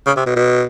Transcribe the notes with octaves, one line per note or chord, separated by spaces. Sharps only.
C#3
C3
B2
B2